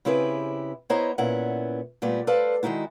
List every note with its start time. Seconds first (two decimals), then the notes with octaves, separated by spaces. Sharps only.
0.05 C#3 C4 E4 G4 G#4 B4
0.90 B3 E4 C5 C#5 D#5 A#5
1.18 A#2 B3 C#4 E4 F#5
2.02 A#2 G3 A3 B3
2.27 A4 B4 C5 D5 F5 A5
2.63 D#3 G#3 D#4 E4 F#4